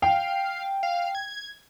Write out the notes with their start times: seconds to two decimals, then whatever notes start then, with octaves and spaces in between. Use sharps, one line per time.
0.02 F5 G5
0.83 F5
1.15 G#6